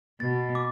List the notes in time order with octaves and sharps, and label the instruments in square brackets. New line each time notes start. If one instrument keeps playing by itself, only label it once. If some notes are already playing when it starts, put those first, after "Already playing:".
[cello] B2 [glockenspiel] A6
[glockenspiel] D6